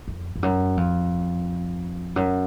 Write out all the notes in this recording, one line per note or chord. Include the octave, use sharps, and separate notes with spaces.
F2
F2
F#2
F2
F#2